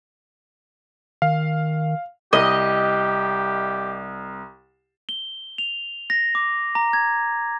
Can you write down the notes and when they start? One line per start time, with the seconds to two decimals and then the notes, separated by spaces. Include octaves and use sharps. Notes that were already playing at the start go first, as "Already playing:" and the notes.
1.22 D#3 F5
2.33 C2 G4 D#5
5.09 G7
5.58 F7
6.10 A#6
6.35 D6
6.75 A#5
6.93 G#6